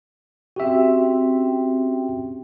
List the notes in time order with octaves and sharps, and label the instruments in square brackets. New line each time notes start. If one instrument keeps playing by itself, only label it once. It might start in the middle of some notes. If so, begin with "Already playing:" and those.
[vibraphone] C4 C#4 G5 [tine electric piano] F#4 G4 E5